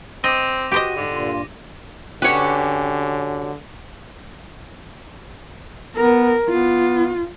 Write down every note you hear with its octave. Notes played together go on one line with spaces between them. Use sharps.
C4 D#5 D6 A#6 D#7
F#4 G4 C5 D#5
G#2 D3
G2 A#2 F4
D3 C#4 F#4 G4 B4 C#5
B3 A#4
B3 F4